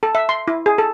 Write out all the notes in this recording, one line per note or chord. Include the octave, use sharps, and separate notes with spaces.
A4
E5
C6
E4
G#4
A4